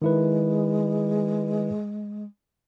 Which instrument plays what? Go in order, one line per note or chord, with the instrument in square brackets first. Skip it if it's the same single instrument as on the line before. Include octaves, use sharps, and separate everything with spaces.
[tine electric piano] D#3 E4 B4 [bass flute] G#3